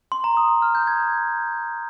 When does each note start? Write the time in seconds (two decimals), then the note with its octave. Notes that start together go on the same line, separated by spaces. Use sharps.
0.12 C6
0.24 A#5
0.37 D#6
0.49 D#6
0.62 F6
0.75 G6
0.87 G#6